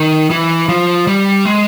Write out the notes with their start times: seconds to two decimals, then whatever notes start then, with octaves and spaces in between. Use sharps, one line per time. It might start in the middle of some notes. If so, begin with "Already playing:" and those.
Already playing: D#3
0.30 E3
0.69 F3
1.07 G3
1.45 G#3